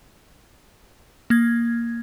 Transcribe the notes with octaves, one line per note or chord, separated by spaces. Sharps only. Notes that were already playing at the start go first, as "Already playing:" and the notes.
A#3 G#6